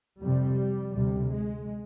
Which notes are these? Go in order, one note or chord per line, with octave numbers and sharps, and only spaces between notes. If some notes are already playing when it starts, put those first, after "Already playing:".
F2 C3 G3
D2 C3 G3
G#3